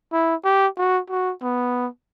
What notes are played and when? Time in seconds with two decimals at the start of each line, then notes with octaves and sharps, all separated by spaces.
0.13 E4
0.45 G4
0.77 F#4
1.10 F#4
1.42 B3